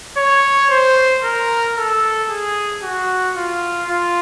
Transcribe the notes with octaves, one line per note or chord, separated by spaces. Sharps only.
C#5
C5
A#4
A4
G#4
F#4
F4
F4